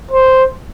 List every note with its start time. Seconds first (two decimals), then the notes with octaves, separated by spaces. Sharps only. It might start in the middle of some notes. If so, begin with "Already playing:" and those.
0.11 C5